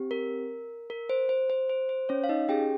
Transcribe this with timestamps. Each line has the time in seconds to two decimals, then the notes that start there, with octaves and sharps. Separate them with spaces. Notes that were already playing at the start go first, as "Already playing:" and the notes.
Already playing: C4 G4
0.11 A#4
0.90 A#4
1.09 C5
1.29 C5
1.50 C5
1.69 C5
1.89 C5
2.09 C#4 C#5
2.24 F5
2.29 D#4 D#5
2.49 C#4 G4 G#4 G5